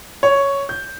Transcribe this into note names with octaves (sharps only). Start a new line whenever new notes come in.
C#5
G6